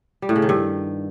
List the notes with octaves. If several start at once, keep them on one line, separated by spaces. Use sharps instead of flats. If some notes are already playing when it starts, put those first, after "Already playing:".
G3
A2
C#3
D#3
G2